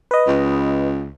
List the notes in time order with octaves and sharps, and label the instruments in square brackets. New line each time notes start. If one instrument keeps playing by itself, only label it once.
[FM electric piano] B4 D#5
[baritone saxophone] C#2